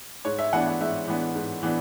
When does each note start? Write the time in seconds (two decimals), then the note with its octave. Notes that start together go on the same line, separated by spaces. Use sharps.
0.25 G#2 C#5
0.39 E5
0.53 E3 B3 D4 F#5
0.67 F#5
0.81 G#2 E5
1.08 E3 B3 D4
1.35 G#2
1.63 E3 B3 D4